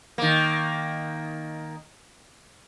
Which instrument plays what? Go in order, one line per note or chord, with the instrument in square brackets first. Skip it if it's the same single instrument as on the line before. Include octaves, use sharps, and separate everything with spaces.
[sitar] D#3 A#3